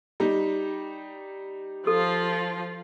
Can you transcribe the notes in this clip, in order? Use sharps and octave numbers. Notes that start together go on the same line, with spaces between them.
G3 D#4
F3 F4 A4